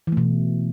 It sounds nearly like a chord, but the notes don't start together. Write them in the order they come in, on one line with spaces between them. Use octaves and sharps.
E3 A3 B2